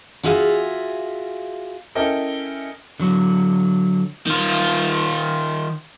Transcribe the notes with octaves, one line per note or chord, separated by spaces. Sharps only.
F4 F#4 G#4 E5 F5
C#4 E4 A4 A#4 D#5 G5
D3 F#3
D#3 F4